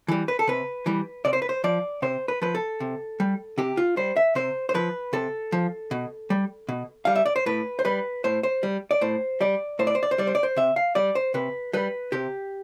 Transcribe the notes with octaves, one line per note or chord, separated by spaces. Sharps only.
E3 G3
B4
A4
C3 B4
E3 G3
C3 D5
C5
B4
C5
F3 D5
C3 C5
B4
F3 B4
A4
C3
G3
C3 G4
F4
G3 C5
E5
C3 C5
C5
F3 B4
C3 A4
F3
B2
G3
B2
G3 F5
E5
D5
C5
A2 B4
C5
G3 B4
A2 C5
C5
G3
D5
A2 C5
G3 D5
A2 C5
D5
C5
D5
C5
G3 D5
C5
D5
C5
C3 E5
F5
G3 D5
C5
C3 B4
G3 B4
C3 G4